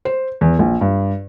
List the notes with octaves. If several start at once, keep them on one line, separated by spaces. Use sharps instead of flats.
C5
E2
A#1
G2